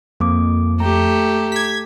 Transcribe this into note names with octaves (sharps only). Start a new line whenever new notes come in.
F2 A#3 D6
A3 G4 A#5
G#6 B6